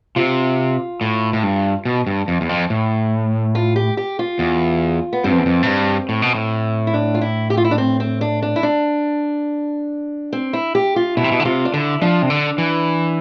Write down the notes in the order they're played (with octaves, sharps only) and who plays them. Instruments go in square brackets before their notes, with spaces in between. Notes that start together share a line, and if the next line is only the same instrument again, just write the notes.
[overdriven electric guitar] C3 [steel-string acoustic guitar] F4
[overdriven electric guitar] A2
A2
G2
B2
G2
F2
E2
F2
A2
[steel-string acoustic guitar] F4
G4
G4
F4
[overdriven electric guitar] E2
[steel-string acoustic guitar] B3
[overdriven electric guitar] G2 [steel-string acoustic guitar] C4
[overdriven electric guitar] F2
E2
F2
A2
G2
A2
B2
A2
[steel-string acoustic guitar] E4
D4
F4
E4
G4
F4
E4
D4
C4
C4
D4
D4
E4
D4
C4
E4
G4
F4
[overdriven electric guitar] B2 [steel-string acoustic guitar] E4
[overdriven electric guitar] C3
B2
D3
[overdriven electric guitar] C3 [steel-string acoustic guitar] F4
[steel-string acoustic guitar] D4
[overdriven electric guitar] D3 [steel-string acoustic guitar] E4
[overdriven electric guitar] F3 [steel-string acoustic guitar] D4
[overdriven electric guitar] C3
D3
E3